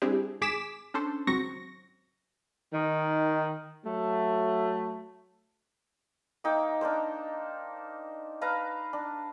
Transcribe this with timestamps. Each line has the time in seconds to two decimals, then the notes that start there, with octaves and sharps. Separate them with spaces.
0.02 G3 C4 D4 E4 G4 G#4
0.41 G#1 G#4 D6 B6 E7
0.94 C#4 D4 A4 C5
1.27 G#1 C#2 F#3 C4 C#6 A#6
2.73 D#3
3.84 F#3 A3
6.44 A#3 D#4 G5 D6
6.81 D4 D#4 A#4 C5
8.41 B4 F5 A5 A#5
8.93 D4